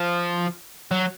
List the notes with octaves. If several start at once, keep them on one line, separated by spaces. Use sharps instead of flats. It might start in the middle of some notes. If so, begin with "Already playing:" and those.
Already playing: F3
F#3